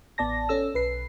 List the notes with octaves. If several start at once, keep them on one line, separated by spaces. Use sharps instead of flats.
A1 B3 D5 A5 A#6
C#4 A4 E6
B1 B4 C7